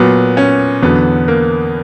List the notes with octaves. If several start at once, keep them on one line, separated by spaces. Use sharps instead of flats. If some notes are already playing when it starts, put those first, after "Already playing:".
Already playing: A#2 F#3 B3
C#4
E2 D3 F#3 B3
A#3